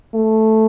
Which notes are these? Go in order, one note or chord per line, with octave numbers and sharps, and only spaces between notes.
A3